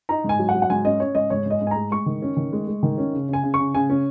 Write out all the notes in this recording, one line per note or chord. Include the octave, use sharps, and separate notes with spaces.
D#4 A#5
G#2
G#5
F#3
F#5
F#3
F#5
G#2 G#5
C#4 D#5
C#4 C#5
G#2 D#5
G#2 C#5
G#2 D#5
G#2
G#5
G#3 A#5
G#3 C#6
D#3
C#4
D#3
G#3
G#3
D#3
C#4
C#3
C#3 G#5
C#3
C#6
C#3
C#3 G#5
C#4